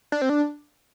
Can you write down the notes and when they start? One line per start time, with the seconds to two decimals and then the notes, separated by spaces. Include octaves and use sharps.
0.12 D4
0.22 C4
0.29 D4